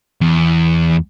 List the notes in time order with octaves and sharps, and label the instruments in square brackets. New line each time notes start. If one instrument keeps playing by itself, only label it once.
[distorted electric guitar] E2